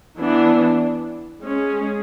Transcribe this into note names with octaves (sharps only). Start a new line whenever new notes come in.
E3 B3 D4
G#3 C#4
G#4